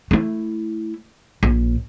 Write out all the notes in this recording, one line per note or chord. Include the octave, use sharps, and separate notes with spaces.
A3 E4
A#1